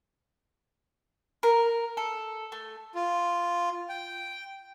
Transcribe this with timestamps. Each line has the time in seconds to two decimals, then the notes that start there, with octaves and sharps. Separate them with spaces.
1.43 A#4
1.97 A4
2.52 A3
2.95 F4
3.89 G5